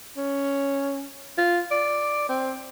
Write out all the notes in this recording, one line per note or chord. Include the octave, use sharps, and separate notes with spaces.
C#4
F4
D5
C4